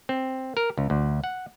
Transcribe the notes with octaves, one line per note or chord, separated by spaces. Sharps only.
C4
A#4
C#2
D2
F#5